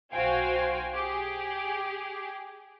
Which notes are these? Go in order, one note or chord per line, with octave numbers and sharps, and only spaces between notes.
B1 F#4 C5 F5 G5 G#5
G4 G#4